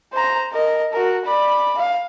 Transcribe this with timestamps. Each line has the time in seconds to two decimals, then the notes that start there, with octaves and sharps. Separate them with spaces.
0.13 C5 A#5
0.52 A#4 D#5
0.92 F#4 A#4
1.25 D5 B5
1.77 F5